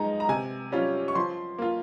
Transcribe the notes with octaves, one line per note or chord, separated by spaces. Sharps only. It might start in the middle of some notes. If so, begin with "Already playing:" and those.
Already playing: F3 G#3 D#4 A#5
A#5
C3 G#5
G3 C#4 F4
C#6
F3 C6
A#3 F4